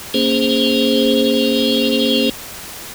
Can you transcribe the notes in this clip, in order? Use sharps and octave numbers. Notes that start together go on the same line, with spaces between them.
A#3 C#4 G#4 C5